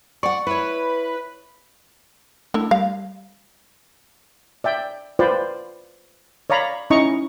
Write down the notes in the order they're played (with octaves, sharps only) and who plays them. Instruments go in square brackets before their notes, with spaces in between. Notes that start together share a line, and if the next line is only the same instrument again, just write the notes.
[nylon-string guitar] D5 F#5 [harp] C#6
[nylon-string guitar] E4 C#5 [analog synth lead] B4
[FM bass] A3 [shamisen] D4 E4
[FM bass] G3 [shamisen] F5
[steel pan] D5 E5 G5
F4 B4 C5 D5 G5
C#5 D5 F5 A#5 B5
C#4 D#4 E4 D#5 A#5 C#6